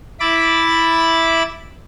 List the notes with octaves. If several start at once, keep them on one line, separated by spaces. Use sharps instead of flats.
E4 B5 D6 A6